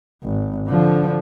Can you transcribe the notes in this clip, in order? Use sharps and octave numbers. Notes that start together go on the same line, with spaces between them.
G#1
D3 F3